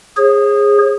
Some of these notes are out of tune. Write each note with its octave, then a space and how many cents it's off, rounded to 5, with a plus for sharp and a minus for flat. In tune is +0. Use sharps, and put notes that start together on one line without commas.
G#4 -15 C#5 -45